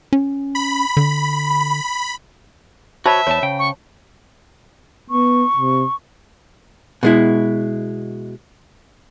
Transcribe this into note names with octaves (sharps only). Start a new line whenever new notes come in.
C#4
B5
D3
F#4 C5 C#5 E5 A5 B5
E2 C#5 A5
C#3 G5
C#6
B3 C#6
C3
B2 G#3 E4